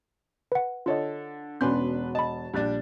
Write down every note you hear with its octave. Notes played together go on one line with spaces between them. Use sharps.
B4 F#5
D3 F4 A4 C#5 D#5
E1 B2 C#4 D4 B4 C6 G6
D#5 A5 B5
A#1 G3 D4 F#6 A6